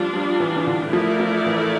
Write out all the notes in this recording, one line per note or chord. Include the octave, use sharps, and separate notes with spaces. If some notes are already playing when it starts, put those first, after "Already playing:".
Already playing: F3 G3 A3 D4 F4
F3
E3
E3
D3
E3
F3 A3 E4 A#4 D5
F3
E3